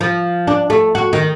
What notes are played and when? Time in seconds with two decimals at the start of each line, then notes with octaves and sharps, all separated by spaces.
0.01 F3
0.47 D4
0.70 A3
0.95 F#4
1.13 D#3